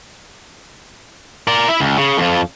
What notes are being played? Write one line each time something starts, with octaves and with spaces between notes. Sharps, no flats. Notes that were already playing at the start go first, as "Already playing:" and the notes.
A#4 D5
E4 E5
C#2
C#3
F2 F3